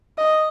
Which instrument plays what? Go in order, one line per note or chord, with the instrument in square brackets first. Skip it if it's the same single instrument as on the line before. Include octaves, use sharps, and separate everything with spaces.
[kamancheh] D#5